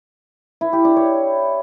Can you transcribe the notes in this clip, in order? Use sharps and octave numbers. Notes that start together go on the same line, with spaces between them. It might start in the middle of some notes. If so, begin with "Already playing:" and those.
E4
G4
D4
C#5